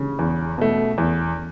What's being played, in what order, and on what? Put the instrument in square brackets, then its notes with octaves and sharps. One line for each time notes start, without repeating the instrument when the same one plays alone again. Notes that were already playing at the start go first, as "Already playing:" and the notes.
Already playing: [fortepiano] C#3
[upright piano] E2
B2 A3
E2